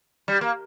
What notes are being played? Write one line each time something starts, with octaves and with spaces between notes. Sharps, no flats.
G3
A#3